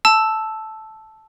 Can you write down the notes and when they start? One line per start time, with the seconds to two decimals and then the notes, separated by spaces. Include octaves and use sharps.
0.05 A5 E6